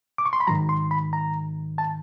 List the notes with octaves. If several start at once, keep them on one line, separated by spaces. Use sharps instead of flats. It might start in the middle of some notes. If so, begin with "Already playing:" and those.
D6
C#6
C6
B5
G#2 D#3 F#3 A#5
C6
B5
A#5
A5